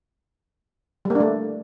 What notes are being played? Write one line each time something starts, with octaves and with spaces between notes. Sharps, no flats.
G3 A3 A#3 D4